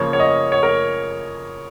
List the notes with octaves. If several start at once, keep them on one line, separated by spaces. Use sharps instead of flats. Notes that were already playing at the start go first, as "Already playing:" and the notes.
Already playing: C#3 F3 A#3 C#5
C#5
D#5
C#5
A#4